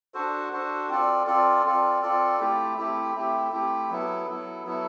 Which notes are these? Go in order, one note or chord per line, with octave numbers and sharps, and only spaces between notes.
D4 F#4 A4 C5
D4 F#4 A4 C5
C4 F4 A4 D5
C4 F4 A4 D5
C4 F4 A4 D5
C4 F4 A4 D5
A3 C4 E4 G4
A3 C4 E4 G4
A3 C4 E4 G4
A3 C4 E4 G4
F#3 B3 E4 A4
F#3 B3 E4 A4
F#3 B3 E4 A4